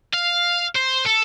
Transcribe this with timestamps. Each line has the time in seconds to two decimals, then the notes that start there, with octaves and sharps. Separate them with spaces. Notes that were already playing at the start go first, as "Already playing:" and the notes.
0.13 F5
0.75 C5
1.06 A4